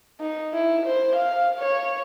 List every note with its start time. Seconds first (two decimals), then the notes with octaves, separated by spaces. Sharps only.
0.20 D#4
0.53 E4
0.86 C5
1.16 F5
1.59 C#5